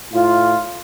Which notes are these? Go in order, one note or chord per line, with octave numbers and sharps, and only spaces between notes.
A2 F4